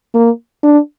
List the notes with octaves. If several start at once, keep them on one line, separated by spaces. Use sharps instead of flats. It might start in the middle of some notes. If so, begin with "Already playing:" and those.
A#3
D4